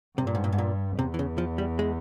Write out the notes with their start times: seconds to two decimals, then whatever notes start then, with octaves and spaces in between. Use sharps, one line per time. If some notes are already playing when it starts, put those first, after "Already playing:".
0.18 G2 C3
0.27 A#2
0.35 G#2
0.44 A#2
0.52 G#2
0.58 A#2
0.98 E2 C3
1.14 E3
1.19 C#3
1.38 F3
1.58 G3
1.79 G#3